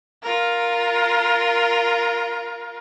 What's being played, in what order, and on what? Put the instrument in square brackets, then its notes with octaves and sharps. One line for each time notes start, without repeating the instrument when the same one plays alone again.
[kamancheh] F4 A#4